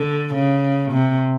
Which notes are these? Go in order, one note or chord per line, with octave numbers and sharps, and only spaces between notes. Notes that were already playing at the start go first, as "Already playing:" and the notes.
Already playing: D3
C#3
C3